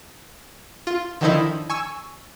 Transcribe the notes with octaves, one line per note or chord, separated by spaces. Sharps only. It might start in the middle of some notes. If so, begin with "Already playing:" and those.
F4
D3 D#3 F3 D#4 E4
G#5 C#6 E6